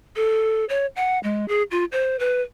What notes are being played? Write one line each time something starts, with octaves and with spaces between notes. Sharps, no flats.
A4
C#5
F#5
G#3
G#4
F4
C5
B4